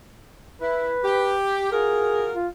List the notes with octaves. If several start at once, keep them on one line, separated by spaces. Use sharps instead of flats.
E4 B4
G4
F4 F#4 G#4 A#4
F4